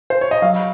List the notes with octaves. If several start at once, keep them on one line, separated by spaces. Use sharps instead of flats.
C5
C#5
D#5
F#3 F5